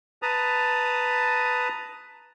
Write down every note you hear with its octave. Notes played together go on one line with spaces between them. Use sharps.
B4 A5 A#5 D#6